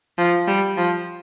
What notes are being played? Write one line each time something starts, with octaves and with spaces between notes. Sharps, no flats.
F3
G3
F3